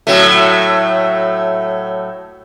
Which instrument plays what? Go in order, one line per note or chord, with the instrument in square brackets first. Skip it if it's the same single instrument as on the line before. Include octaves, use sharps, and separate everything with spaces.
[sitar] A2 F#3 A3